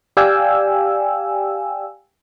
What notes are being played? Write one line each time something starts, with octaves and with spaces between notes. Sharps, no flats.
G4 D5 F5 G5 G#5 E6